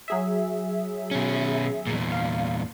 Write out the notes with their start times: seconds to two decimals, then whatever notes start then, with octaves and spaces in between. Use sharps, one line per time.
0.08 F#3 G#4 E5
1.11 B2 C#4
1.87 E2 A#2
2.12 F5